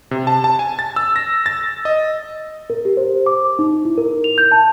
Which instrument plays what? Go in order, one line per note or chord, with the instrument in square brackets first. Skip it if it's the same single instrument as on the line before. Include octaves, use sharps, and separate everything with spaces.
[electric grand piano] C3
A5
A5
G#5
A6
E6
A#6
A6
D#5
[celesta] A#4
G4
C5
D6
D#4
E4
A#4
F7
G6
A5